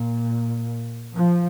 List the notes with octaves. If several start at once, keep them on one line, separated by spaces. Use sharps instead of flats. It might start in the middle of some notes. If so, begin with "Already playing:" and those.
Already playing: A#2
F3